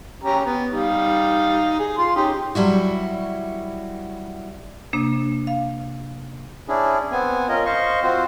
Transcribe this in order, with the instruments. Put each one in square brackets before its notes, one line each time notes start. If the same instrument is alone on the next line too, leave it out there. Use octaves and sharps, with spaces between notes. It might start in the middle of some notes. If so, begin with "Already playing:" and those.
[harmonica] C#4 G4 A#5
B3
G3 D#4 F5
G#4
F4 C6
C#4 D#4 G4
[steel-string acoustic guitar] F#3 G3 E4 F#4
[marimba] C3 A#3 D4
F5
[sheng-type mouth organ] C#4 D4 E4 G#4
B3 C4 G#5
C#4 F4 A#4 D#5
C5 D#5 F5 C#6
C4 F4 F#4 C5